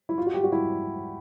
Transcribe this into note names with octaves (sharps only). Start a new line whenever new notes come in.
E4
F4
F#4
G4
F#4
E4